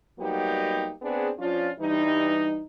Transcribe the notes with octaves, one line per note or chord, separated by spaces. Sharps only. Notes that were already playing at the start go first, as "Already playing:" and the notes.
F#3 G3 A#3 B3 D#4 G4
B3 C4 D4 G#4
F3 C#4 D4 F4
G2 E3 G3 D#4